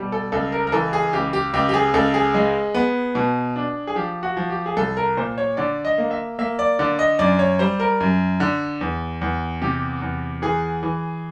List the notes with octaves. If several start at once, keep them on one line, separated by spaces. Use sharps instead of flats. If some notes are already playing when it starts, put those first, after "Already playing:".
Already playing: B2 G3
A4
C#2 A4
A#4
A#4
E3 A4
G#4
C#2 G4
G4
C#2 G4
G4
G#4
C#2 A4
G#4
G#3
B3
B2
D4
G#4
F3 G4
F#4
F3
G4
G#4
C2 A4
A#4
A#2 C5
C#5
D3 D5
D#5
A#3
E5
A#3 E5
D5
D3 D5
D#5
F#2 D5
C#5
G3 C5
A#4
F#2
D3
E2
E2
C3 G4
E2
E3 G#4
E3